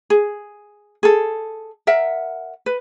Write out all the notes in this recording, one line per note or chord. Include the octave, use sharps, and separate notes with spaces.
G#4
G#4 A4
A#4 E5 F#5
B4